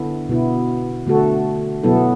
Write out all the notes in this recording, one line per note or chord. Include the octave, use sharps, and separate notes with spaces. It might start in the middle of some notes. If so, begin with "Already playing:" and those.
Already playing: D3 B3 E4 A4
B2 B3 E4
D3 A3 F#4 A4
B2 F#3 B3 E4 A4